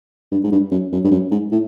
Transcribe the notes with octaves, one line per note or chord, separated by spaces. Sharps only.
G2
G#2
G2
F#2
F#2
G2
F#2
G#2
A2